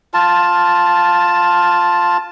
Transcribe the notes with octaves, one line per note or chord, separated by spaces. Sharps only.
F4 A5